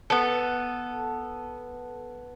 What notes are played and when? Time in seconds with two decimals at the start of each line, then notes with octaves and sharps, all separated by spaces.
0.10 B3 A4